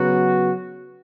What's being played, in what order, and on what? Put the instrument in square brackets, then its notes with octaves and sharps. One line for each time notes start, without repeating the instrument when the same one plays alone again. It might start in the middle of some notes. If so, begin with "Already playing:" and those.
Already playing: [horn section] C#3 F#3 B3 F#4